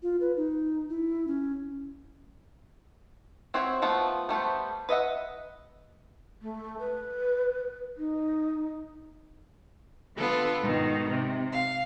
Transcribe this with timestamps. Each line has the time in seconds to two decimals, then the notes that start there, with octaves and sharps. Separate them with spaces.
0.03 F4
0.20 B4
0.37 D#4
0.89 E4
1.27 C#4
3.54 C4 F#4 C5 C#5 E5
3.82 F3 A3 B3
4.29 G3 A3 B3 C5
4.89 B4 D#5 E5 F#5
6.42 A3
6.79 B4
7.97 D#4
10.16 D3 B3 F4 A4
10.62 G#2 B2 D#3
11.08 C3
11.52 F5